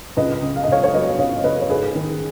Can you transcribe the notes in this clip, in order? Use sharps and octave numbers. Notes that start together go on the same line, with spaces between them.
C#2 B4 D#5
C#3
F5
D#5
C#2 C#5 F5
C#5
F#3 B4 D#5
C#2 C#5 F5
C#3 B4 D#5
C#5
G#2 G#4 B4
D#3